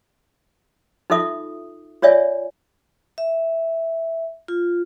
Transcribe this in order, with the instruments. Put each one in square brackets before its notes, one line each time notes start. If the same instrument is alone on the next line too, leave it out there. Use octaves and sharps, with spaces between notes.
[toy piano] D#4 F4 A4 E5 D#6
F4 C#5 D5 E5 G#5
[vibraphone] E5
F4